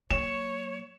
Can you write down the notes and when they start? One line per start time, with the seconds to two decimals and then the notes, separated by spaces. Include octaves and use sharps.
0.10 F#3 A#3 C#5 E7